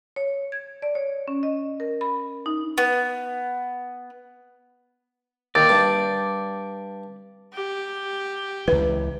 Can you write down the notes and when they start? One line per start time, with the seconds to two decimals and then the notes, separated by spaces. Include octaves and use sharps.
0.16 C#5
0.52 G#6
0.82 D5
0.95 C#5
1.28 C#4
1.43 D#5
1.80 A#4
2.01 B5
2.46 D#4
2.78 B3
5.55 D#2 D5
5.69 G2
7.53 G4
8.68 C#2 E3 B4